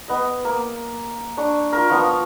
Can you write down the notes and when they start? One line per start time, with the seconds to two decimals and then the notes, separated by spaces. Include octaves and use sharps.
0.08 B3 D#5
0.45 A#3
1.37 D4 C#6
1.73 F4 A#4
1.89 F3 B3 F5 C#6